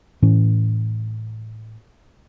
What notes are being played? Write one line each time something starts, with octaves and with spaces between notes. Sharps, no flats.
A2 E3 C#4